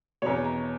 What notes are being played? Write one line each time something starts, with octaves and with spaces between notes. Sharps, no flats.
E2 B2 C#5
A#5